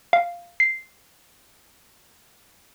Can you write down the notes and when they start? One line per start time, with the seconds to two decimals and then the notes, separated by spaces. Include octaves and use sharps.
0.13 F5
0.60 C7